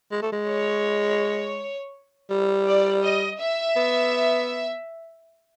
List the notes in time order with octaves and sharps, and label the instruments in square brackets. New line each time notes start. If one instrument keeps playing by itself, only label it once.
[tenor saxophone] G#3
A3
G#3
[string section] C#5
[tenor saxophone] G3
[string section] D5
D#5
E5
[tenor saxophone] B3